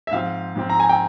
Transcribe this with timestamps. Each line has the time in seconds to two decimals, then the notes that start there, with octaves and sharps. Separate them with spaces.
0.07 E5
0.11 G#2 F3 C4 F5
0.56 G#2 F3 C4
0.69 A#5
0.80 G#5
0.89 G5